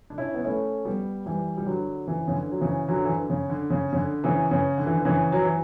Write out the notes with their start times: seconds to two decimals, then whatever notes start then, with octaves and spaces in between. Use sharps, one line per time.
0.10 D4
0.18 C#4 E4
0.34 B3
0.44 A3 C#4
0.85 G3 B3
1.26 E3 G3
1.57 G3
1.66 D3 F#3
2.07 C#3 E3
2.28 C#3
2.34 D3
2.51 F#3
2.61 C#3 E3
2.88 D3 F#3
3.04 E3
3.08 D3
3.30 C#3
3.50 D3
3.70 C#3
3.93 C#3
3.97 D3
4.24 C#3 E3
4.51 C#3
4.78 D3
4.86 E3
4.94 D3
5.05 C#3 E3
5.32 F#3
5.44 E3